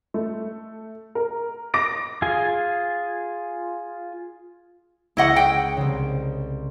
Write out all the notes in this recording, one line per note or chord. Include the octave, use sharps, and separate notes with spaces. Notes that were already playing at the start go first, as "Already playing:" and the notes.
A3
A#4
D6 A#6 D7
F4 G#4 G#5
C#2 E4 D#5 F#5 C#6 D6
G5
C2 C#3